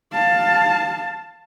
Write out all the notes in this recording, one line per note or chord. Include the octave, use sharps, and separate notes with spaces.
F5 A5